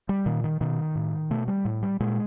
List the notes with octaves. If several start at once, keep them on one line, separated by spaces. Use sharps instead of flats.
G3
A#2 D#3
D#3
B2 D#3
A2
B2 A3
G3
A2
G3
A#2 G#3